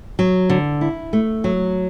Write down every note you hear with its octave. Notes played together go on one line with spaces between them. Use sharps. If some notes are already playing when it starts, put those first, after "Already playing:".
F#3
D3
E4
A3
F#3